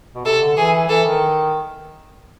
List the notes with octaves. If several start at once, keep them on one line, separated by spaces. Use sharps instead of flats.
B2
C3 A4
D3
E3 G#4
E3 A4
D#3